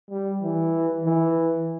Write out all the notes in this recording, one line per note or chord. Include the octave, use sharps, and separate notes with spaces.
G3
E3
E3